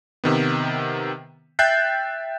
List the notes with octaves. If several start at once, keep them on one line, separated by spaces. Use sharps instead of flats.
C3 D#3 B3
E5 G5 F#6 G6 A6 C7